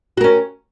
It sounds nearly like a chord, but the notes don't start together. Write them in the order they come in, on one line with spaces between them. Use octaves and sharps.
F#4 A#4 C#4